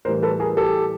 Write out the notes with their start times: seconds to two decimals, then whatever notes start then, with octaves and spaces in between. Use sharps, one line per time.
0.05 A2 E3 G3 A#4 C5
0.22 A4 B4
0.40 G#4 A#4
0.57 G4 A4